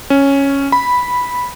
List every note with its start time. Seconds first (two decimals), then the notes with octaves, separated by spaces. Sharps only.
0.10 C#4
0.72 B5